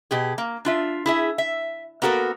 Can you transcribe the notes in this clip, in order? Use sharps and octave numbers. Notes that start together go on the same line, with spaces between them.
B2 G4 G#4
A#3
D4 F4 E5
E4 G#4 E5
E5
A#3 B3 F#4 A4 A#4